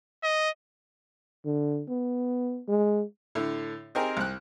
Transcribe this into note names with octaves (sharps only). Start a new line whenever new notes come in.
D#5
D3
B3
G#3
A2 D3
C4 D#4 G4 G#4 A#4
C2 F#6